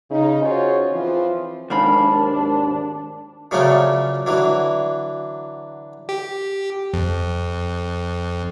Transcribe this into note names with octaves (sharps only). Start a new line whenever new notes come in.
C#3 D#4
C#4 F4 F#4 G#4 C5 C#5
E3 F3 C4 F4
D#2 G#2 D4 A#4 F5 B5
A#2 C#3 F3 F#3 A3
D3 E3 F#3
G4
F2